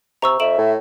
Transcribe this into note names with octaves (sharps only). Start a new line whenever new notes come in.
C3 A#5 C#6 E6
F2 E5 D7 E7 F#7
A2